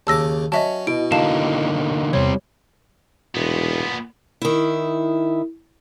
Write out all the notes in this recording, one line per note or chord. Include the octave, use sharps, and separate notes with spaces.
D#2 C#3 A5 D6 E6 A#6
F#3 C#4 D#5 E5 A5
B2 E4 F#4 D#5 D7
D3 A#3 D#4 F5 A5 E7
E2 C3 G3 C4 C#5
E1 A#2 B3
D#3 E4